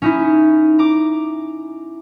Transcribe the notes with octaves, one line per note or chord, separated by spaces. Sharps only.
C#4 D#4 E4
A#5 D6